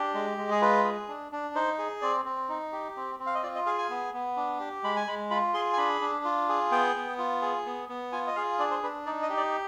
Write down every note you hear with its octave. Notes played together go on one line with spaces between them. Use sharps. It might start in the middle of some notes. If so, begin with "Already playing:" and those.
Already playing: D4 G4
G#3
G#3
G#4
F4 B4
G#4
D4
D4
D#4 C5
G#4
C4 D5
C4
D#4
G4
C4
C4
F5
D#5
F4 D5
D#5
G#4 F5
G#5
B3
B3
D4
G4
G#3 B5
G#5
G#3 B5
F4 B5
G#4 C6
G#5
D4 B5
D4
F4
G#4
B3 G5
B3
F4
G#4
B3
B3
F4 G#5
D#5
G#4 F5
D4 D5
C5
D4 B4
D#4 D5
D#5
G4
D5